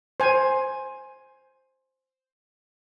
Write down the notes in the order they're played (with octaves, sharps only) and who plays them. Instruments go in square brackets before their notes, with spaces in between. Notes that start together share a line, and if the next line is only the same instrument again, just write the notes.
[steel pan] C5 G#5